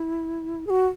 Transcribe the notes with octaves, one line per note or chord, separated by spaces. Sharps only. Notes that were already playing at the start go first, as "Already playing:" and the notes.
Already playing: E4
G#4
F#4